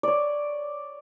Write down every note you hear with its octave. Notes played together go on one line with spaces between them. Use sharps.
C#5 D5